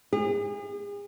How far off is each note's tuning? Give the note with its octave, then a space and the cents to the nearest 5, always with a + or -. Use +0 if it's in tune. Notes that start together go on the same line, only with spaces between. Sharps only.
G#4 -40